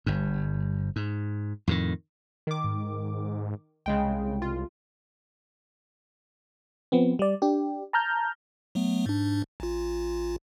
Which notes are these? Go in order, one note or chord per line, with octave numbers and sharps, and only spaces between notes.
G1 G2
G#2
F2 A2 D3 D#3
D#3 D6
G#2
C2 C#3 G#3 G5
F4
F3 B3 C4
G3 D5
D4 G4
A5 A#5 F6 G6
F#3 A3 B3
G#2 D4
A1 F4